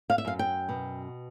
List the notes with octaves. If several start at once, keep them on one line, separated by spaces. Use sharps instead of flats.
F5
E5
F#2 F5
G5
B2